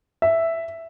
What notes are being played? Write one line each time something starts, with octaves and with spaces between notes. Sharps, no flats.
E5